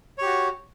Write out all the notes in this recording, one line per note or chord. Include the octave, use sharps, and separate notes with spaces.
F#4 G4 C#5